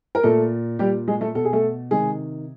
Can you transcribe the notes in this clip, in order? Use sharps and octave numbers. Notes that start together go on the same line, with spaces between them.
A#4
A#2 A3 A4
A#2 G3 G4
G#3 G#4
A3 A4
B2 A4
G#4
A3 A4
C3 D#3 G#3 G#4